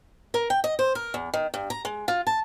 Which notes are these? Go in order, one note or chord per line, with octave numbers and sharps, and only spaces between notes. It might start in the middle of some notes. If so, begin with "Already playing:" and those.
A#4
G5
D#5
C5
A#4
E2
D#3
G2
A#5
G#3
F4
A5